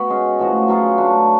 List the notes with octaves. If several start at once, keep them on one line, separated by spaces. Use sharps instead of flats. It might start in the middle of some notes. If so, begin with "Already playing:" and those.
Already playing: B3 F#4 B4
G#3 C#4 G#4
A2 F3 B3 F#4
F#3 B3 F4 G#4
F#3 A3 D4